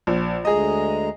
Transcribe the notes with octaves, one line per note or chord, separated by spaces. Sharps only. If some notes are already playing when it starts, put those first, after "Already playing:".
A#1
D2 G#3 G#4 D#5 A#5